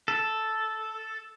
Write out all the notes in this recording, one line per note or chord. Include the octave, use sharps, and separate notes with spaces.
A4